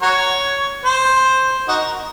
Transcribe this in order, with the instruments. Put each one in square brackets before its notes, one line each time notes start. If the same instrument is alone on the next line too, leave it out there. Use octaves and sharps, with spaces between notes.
[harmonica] F#4 A#4 C#5
C5
D#4 F#4 A#4